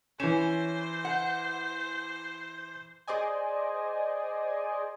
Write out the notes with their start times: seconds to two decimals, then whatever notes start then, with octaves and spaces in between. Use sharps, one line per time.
0.20 E3 C#4 C5 E7
1.05 F#5
3.08 G#4 C5 D5 D#5 G#5